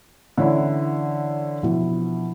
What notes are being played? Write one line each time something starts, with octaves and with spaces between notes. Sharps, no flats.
D3 E3 C#4 D4 E4 F#5
B2 F3 E4